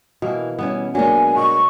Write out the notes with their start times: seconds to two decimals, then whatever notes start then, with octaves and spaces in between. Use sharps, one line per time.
0.22 B2 E3 A#3
0.59 E3 G3 B3 C#4
0.95 F#3 G#3 A#3 D4 G#5
1.36 B2 C#6